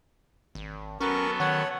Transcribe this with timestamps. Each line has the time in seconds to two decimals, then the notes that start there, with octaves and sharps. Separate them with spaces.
0.55 G#1
1.01 F#3 B3 C#4 A4 A#4 C#6
1.40 D#3 C#5 F#5